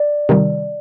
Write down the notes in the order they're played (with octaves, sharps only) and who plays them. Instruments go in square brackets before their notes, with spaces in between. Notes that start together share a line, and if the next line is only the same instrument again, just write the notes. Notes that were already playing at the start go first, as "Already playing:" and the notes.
Already playing: [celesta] D5
[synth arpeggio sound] C3 D#3 G3